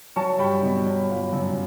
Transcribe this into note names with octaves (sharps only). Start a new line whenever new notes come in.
F#3 A5 C#6
G2 G5 B5
B2
F#3
G1
F#2